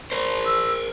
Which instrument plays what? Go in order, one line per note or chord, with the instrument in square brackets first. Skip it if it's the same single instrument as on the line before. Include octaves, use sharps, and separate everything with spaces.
[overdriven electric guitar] A#4 C5
[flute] E6